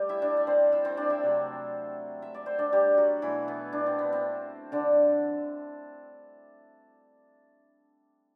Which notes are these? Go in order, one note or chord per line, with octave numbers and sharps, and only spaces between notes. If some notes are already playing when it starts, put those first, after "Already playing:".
Already playing: G3 A3 G4
E4 E5
D4 D5
D5
C4 C5
E4 E5
C4 C5
D4 D5
E4 E5
C3 F#3 A3
E5
D5
C5
D4 D5
G3 G4
F#3 F#4
B2 E3 A3 E4
B3
D4
C4
B3
C4
D3 D4